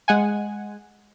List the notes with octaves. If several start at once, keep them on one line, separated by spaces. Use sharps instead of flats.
G#3 F#5 G#5